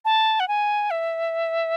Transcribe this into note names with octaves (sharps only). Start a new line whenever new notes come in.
A5
F#5
G#5
E5